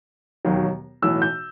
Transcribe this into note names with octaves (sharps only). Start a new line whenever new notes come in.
E1 D#2 D#3 F#3
B1 A2 E3 E6
G6